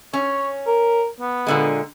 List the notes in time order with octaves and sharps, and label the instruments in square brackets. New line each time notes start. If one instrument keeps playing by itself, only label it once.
[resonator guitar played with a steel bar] C#4 [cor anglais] C#5
[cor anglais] A#4
B3
[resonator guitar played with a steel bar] A#2 D3 G#3